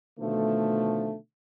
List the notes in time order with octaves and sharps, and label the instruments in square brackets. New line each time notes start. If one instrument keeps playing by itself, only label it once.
[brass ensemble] B2 D3 D#3 F3 A3